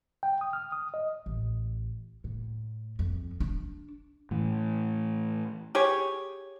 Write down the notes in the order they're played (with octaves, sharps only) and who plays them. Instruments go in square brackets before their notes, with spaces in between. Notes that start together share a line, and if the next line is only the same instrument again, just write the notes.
[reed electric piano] G5
D#6
F6
D#6
D#5
[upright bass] A1
A2
F2
D4
[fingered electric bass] A2 E3
[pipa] G4 G#4 C#5